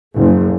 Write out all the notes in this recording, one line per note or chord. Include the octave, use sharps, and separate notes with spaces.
F#1